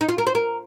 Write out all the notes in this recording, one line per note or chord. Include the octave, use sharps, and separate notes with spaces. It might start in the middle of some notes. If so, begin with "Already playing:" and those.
D#4
F4
A#4
C5
A#4